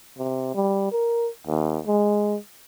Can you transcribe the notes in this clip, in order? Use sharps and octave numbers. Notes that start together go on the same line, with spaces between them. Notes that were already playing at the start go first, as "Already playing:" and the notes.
C3
G3
A#4
D#2
G#3